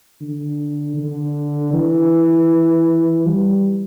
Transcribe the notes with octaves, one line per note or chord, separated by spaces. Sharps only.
D3
D3
E3
G3